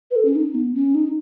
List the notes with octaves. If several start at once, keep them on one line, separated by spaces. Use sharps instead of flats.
B4
A4
C#4
D#4
B3
C#4
D#4